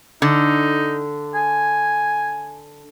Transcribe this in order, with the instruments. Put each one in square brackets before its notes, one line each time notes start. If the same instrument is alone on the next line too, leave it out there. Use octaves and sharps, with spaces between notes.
[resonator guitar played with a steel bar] D3 [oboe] D#4
[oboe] G#5